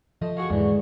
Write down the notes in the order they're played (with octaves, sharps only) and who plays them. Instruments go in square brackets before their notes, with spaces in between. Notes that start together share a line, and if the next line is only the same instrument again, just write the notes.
[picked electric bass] F3 [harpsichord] A3 D#5
[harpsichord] F#4 G#4 F5 [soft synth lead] C#6
[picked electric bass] E2 G#2 [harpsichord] D3 E3 [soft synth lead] G#3